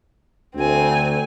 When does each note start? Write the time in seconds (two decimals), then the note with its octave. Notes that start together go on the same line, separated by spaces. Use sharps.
0.56 D2 C4 G#5